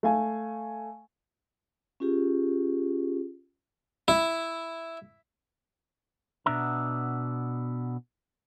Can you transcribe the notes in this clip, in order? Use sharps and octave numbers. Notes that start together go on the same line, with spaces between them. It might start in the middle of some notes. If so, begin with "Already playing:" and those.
A3 F5 G#5
C#4 F4 G4 G#4
E4
B2 B3 D4 E5 A#5